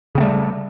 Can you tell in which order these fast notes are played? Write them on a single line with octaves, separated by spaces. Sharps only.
C#3 C4 A3 G3